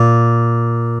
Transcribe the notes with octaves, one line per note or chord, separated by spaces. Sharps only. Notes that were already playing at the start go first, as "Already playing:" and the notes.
Already playing: A#2